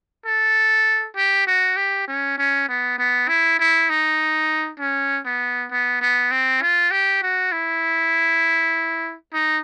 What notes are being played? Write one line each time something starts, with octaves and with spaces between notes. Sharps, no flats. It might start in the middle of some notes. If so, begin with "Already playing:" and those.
A4
G4
F#4
G4
C#4
C#4
B3
B3
E4
E4
D#4
C#4
B3
B3
B3
C4
F4
G4
F#4
E4
D#4